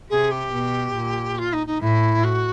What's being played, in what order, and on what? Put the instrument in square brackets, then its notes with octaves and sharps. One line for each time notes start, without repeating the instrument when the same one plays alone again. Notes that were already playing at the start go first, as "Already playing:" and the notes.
[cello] C3 [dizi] G#4
[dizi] G4
[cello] B2
A#2
[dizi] F4
D#4
D#4
[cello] A2 [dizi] E4
[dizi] F#4